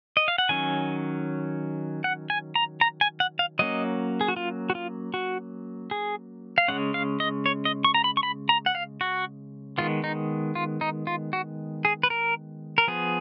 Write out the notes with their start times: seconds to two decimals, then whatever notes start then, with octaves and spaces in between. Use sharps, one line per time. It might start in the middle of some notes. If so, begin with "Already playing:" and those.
0.17 D#5
0.28 F5
0.38 F#5
0.49 D#3 F#3 C#4 G#5
2.04 F#5
2.30 G#5
2.56 A#5
2.81 A#5
3.01 G#5
3.20 F#5
3.39 F5
3.59 F#3 A#3 C#4 D#5
4.21 G#4
4.28 F#4
4.36 F4
4.70 F#4
4.75 F4
5.14 F#4
5.91 G#4
6.58 F5
6.68 C#3 F3 G#3 C#4 F#5
6.94 F5
7.20 D#5
7.46 C#5
7.65 D#5
7.84 C#6
7.94 A#5
8.04 B5
8.17 C#6
8.23 B5
8.49 A#5
8.66 F#5
8.75 F5
9.01 F#4
9.78 D#3 G#3 B3 F4
10.04 D#4
10.55 F4
10.81 D#4
11.07 F4
11.33 F#4
11.85 G#4
12.03 B4
12.10 A#4
12.78 A#4
12.87 F3 B3 G#4